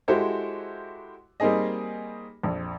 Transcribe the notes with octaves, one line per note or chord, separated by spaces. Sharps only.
G#3 E4 F#4 G4 A4 C5
G3 A#3 C4 D#4 G#4 D#5
A#1 F2